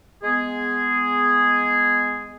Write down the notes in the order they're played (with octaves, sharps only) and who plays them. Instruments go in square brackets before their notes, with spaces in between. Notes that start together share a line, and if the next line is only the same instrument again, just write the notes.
[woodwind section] G#3 B3 G#4